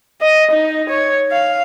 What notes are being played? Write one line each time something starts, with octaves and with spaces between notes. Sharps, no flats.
D#5
D#4
C#5
F5